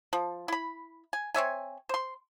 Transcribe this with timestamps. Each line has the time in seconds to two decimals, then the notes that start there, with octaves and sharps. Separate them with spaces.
0.13 F3
0.48 E4 B5
1.13 G#5
1.34 C4 C#5 E5 G#5
1.89 C5 C6